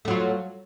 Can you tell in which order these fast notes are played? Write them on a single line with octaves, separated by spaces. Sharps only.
A3 F#3 F4